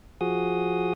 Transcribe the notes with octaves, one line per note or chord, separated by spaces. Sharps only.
F3 F#4 G#4 D#6